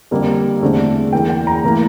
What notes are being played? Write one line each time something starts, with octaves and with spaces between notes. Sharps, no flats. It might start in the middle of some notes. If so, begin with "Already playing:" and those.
F2 D3 G3 A#3
E2 D3 A3 C4
E2 E3 A#3 G5
G5
A#5
A2 E3 A#3